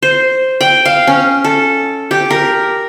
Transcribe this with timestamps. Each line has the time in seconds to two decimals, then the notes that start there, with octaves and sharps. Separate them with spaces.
0.03 C5
0.61 G5
0.85 F5
1.07 C#4
1.44 A4
2.11 G4
2.31 A#4